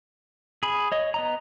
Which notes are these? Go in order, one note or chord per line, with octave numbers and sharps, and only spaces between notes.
G#4 B5
C#5 D#5
B3 D#5 A#5